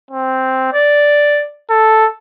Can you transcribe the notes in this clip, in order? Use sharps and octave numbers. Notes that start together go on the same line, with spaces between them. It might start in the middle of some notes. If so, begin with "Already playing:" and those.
C4
D5
A4